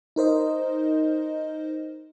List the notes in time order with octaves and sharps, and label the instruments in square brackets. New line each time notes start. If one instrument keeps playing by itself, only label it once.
[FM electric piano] D#4 A#4 C5 D#5